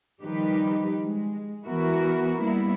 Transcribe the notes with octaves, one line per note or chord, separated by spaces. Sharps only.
D#3 F3 G3 D#4 G4 B4
G#3
E3 B3 E4 F#4 A#4
G3 A#3 B3 E4